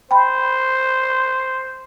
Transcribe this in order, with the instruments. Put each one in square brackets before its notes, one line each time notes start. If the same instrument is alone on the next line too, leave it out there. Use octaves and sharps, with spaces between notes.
[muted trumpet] C5 [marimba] G5 B5